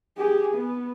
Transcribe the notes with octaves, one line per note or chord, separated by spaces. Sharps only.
G4 G#4
B3